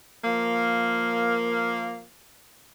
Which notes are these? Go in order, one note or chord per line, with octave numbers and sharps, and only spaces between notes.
F3 A#3